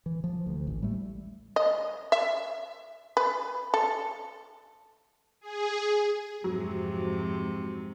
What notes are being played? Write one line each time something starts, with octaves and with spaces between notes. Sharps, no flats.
E3
F3
D2
A1
G3 A3
D#5
E5
B4
A4
G#4
F2 G#2 C3 F#3